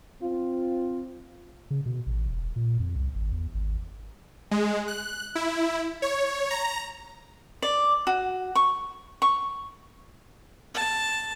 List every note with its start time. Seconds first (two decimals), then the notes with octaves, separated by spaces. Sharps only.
0.22 C4 F4
1.71 C#3
1.86 B2
2.07 A1
2.28 E1
2.56 A#2
2.80 F2
2.96 C2
3.15 G#1
3.32 E2
3.55 G#1
4.51 G#3
4.88 F#6
5.35 E4
6.02 C#5
6.51 A#5
7.62 D5
8.07 F#4
8.56 C#6
9.22 C#6
10.75 A5